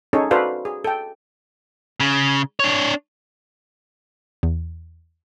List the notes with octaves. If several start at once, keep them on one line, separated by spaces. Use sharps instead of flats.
C#4 D#4 G#4 A4 C#5
F#4 A4 B4 C5 D5 F5
G#4
A4 G5
C#3
D4 C#5
E2